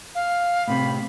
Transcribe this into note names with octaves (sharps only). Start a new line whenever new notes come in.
F5
A2 C3 B5